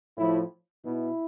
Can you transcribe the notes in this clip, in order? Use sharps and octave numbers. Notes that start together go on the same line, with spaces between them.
A2 F3 E4
B2 E4